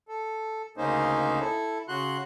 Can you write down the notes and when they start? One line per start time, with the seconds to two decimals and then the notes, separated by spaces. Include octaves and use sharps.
0.08 A4
0.77 D2 C#3 A#3 C#4 D#4 C5
1.40 E4 A4
1.88 C#3 F#4 C6 F#6